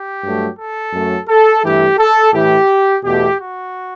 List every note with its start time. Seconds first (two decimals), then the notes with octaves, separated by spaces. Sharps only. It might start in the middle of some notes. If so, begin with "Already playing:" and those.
Already playing: G4
0.23 G2 F#3 A3
0.58 A4
0.93 F#2 F#3 A3
1.28 A4
1.63 G2 E3 A3 G4
1.98 A4
2.33 A2 E3 A3 G4
3.03 E2 B2 A3 G4
3.39 F#4